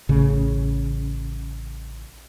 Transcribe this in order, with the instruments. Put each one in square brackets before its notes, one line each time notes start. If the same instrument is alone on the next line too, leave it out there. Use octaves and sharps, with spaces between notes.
[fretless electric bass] A1 C#3